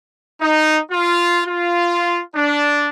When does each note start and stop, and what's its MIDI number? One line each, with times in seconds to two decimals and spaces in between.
0.42 0.79 63
0.92 1.40 65
1.46 2.21 65
2.35 2.89 62